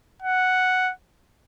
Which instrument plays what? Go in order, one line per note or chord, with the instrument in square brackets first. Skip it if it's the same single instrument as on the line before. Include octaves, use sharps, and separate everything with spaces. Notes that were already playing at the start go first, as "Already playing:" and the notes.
[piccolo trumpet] F#5